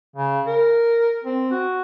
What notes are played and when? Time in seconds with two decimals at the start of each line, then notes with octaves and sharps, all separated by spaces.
0.16 C#3
0.47 A#4
1.24 C4
1.51 F#4